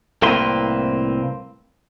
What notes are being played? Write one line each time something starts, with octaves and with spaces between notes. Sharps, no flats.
C2 A2 A#3 C4 B4 C6